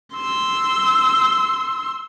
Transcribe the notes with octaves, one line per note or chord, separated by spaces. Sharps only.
C6 E6